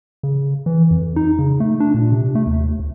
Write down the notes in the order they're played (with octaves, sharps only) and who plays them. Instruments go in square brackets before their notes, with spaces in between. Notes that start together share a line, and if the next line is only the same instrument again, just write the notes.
[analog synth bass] C#3
E3
F2
D#4
C#3
A3
D4
A#2
C3
A3
D#2
D2